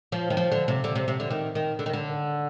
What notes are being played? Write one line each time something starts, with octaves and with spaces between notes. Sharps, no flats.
F3
D#3
F3
D3
C3
D3
C3
C3
D3
D#3
D#3
D3
D#3
D3